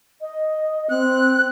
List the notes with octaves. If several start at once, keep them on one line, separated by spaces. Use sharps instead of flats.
D#5
C4 F#6